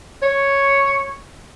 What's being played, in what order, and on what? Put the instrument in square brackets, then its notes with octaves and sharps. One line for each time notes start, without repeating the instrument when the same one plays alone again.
[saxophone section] C#5